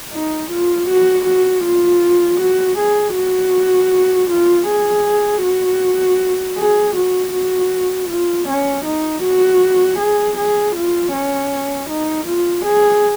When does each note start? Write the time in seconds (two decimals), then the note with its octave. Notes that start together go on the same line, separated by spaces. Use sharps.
0.13 D#4
0.51 F4
0.89 F#4
1.26 F#4
1.65 F4
2.40 F#4
2.78 G#4
3.16 F#4
4.30 F4
4.68 G#4
5.44 F#4
6.57 G#4
6.95 F#4
7.34 F#4
8.09 F4
8.48 C#4
8.85 D#4
9.23 F#4
9.99 G#4
10.37 G#4
10.75 F4
11.13 C#4
11.89 D#4
12.26 F4
12.64 G#4